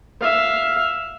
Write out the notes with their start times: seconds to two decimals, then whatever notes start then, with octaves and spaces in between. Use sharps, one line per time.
0.21 E5 F5